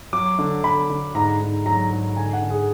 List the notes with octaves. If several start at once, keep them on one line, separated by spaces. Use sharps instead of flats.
F#3 D6
D3
D3 B5
D3
G#2 A#5
G#2
F#3 A#5
G#2
D3 G#5
F#5
D3
G#4